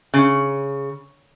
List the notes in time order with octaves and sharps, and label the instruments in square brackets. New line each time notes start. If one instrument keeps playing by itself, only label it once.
[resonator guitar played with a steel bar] C#3